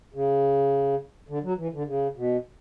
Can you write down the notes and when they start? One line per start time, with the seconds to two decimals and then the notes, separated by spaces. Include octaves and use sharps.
0.14 C#3
1.29 D3
1.43 F#3
1.58 E3
1.73 D3
1.87 C#3
2.17 B2